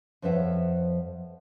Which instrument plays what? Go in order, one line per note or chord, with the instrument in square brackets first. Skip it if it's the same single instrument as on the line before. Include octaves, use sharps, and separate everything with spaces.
[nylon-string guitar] F2 F3 B4 C#5 E5 F#5